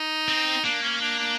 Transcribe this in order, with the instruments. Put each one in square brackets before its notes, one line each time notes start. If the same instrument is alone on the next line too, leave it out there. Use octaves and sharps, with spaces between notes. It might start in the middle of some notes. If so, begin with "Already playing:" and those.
Already playing: [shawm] D#4
[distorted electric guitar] C4
[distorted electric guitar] A#3 [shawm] D4
[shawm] C#4
D4
D4